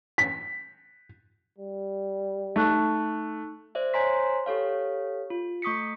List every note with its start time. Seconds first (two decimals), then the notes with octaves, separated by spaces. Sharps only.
0.18 B6
1.59 G3
2.56 A3 D#4 C#6 F#6
3.75 C5 D5 E5
3.94 C5 C#5 G#5 A#5 C6 B6
4.46 G4 A4 C#5 F5
5.30 F4
5.62 A3 C#6 D#6 B6 C#7